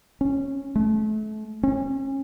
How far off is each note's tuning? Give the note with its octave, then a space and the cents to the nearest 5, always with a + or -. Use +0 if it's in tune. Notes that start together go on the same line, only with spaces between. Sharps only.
C#4 -10
A3 -35
C#4 -35